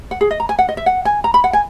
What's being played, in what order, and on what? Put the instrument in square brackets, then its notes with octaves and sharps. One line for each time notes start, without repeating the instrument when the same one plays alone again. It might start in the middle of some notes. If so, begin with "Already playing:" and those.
[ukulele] F#5
G#4
D#5
A#5
G#5
F#5
D#5
E5
F#5
G#5
A#5
B5
F#5
G#5